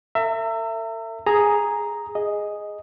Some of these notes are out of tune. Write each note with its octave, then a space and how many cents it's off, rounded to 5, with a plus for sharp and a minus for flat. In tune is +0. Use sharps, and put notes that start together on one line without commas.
A4 +45 E5 +20 A#5 -40
G#4 +0 A#5 +0 D#6 +20
G#4 +0 D#5 +0